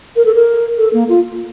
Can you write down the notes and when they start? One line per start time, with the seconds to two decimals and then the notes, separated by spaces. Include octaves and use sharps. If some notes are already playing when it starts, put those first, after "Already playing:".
0.16 A#4
0.25 A4
0.34 A#4
0.78 A4
0.93 A#3
1.09 F4